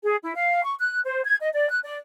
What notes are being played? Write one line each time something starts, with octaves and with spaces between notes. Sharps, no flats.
G#4
E4
F5
C#6
F#6
C5
G#6
D#5
D5
F#6
D5